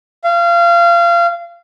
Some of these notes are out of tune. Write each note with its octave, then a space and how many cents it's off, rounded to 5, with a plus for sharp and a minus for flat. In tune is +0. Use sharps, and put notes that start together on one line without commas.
F5 -25